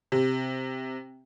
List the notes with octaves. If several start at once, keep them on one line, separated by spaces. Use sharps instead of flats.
C3